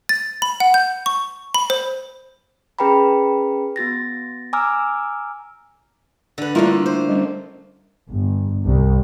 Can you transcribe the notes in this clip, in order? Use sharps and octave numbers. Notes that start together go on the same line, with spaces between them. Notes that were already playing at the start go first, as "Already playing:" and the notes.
A6
B5
F#5
G6
C#6
B5
C5
C#4 G#4 B4 G5 A#5 B5
B3 F#4 A6 A#6
G#5 A#5 D6 E6 F6
D3 B4
D3 G3 A3 A#3 E4 F4
C5
G3 C#4
G1
C2